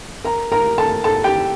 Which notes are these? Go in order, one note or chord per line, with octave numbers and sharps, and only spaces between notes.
A#4 A#5
A#4 A#5
A4 A5
A4 A5
G4 G5